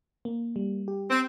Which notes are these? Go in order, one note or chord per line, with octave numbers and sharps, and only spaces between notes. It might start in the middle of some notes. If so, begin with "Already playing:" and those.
A#3
G3
G4
C4